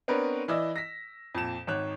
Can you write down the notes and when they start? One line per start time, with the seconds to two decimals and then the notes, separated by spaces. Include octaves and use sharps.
0.08 B3 C4 D4 A#4 B4 C#5
0.48 E3 E4 D5 D#5 E6
0.76 A#6 B6
1.35 F2 A#2 E7
1.67 G#1 D#3 C#5 F#6